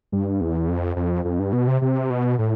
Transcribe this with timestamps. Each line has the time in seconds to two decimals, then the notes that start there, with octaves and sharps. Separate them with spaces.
0.12 G2
0.41 E2
0.68 F2
0.96 F2
1.25 F2
1.39 G2
1.53 B2
1.67 C3
1.82 C3
2.10 B2
2.39 A2